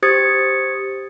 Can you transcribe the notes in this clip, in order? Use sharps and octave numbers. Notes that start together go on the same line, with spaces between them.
G4 C5 D#6 G#6 A6 C#7